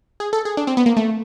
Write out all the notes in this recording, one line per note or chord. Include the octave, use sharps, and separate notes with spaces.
G#4
A4
G#4
D4
C4
B3
A#3
A3